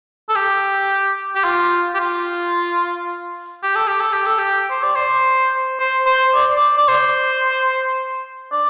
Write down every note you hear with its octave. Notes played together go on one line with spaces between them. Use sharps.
A4
G4
G4
F4
G4
F4
G4
A4
G4
A4
G4
A4
G4
C5
D5
C5
C5
C5
D5
D5
D5
C5
D5